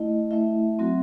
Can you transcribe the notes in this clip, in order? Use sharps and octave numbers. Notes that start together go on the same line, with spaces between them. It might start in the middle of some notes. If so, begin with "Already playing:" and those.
Already playing: A3 E4 D#5
A3 E4 E5
F#3 C4 F#4